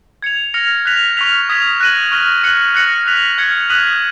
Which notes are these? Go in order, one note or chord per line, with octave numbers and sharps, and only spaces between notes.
G#6 C#7 F7
F6 A#6 C#7 F7
F#6 B6 F7
C#6 F6 B6 F7
D#6 G#6 B6 F7
F#6 A#6 D#7 F#7
C#6 F6 A#6
F#6 C#7 F#7
F#6 A#6 C#7 F#7
F#6 B6 F7
F6 G#6 C#7
D#6 F#6 B6 D#7 F#7